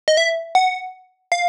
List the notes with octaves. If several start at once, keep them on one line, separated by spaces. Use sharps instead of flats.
D#5
E5
F#5
F5